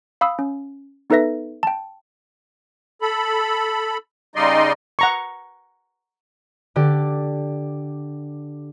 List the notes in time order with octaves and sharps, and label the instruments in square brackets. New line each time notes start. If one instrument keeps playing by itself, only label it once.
[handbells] F5 B5 D#6 E6
C#4
B3 D#4 A4 B4 E5 A#6
G5 A5
[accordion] A4 B5
C#3 G3 D#4 D5 D#5 C6
[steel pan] F#5 A#5 C#6
[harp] D3 G4 D5